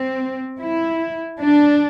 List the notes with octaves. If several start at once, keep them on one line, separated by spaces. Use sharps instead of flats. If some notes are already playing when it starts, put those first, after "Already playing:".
Already playing: C4
E4
D4